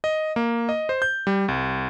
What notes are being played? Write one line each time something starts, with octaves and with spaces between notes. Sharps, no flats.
D#5
A#3
D#5
C5
G6
G3
C2